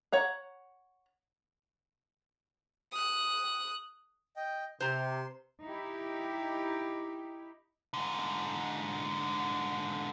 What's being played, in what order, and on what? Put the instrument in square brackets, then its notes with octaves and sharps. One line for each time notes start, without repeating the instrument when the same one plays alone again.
[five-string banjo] C#5 F#5 A#5
[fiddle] D#6 F#6
[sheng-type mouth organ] D#5 G5
[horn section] C3 [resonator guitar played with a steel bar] C5 A#5 [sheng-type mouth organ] C6
[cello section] D#4 E4 G4
[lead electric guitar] G#2 D3